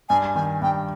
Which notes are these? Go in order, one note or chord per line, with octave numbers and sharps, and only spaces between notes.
G2 G#5
D#3 G#5
G2 G5